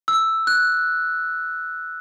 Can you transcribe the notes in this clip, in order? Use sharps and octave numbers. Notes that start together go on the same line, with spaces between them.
E6
F#6